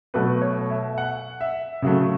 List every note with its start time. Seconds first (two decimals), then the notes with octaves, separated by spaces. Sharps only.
0.14 B2 F#3 A3 B4
0.41 C#5
0.70 E5
0.93 E5
0.98 F#5
1.41 E5
1.82 C#3 F#3 A3